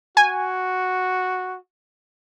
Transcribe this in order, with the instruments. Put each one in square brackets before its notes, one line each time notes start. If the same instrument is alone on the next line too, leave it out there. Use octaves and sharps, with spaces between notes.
[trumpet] F#4 [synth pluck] G#5